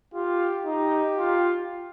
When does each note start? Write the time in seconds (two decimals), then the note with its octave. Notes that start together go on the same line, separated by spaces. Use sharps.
0.14 F4 G4
0.65 D#4 G4
1.17 F4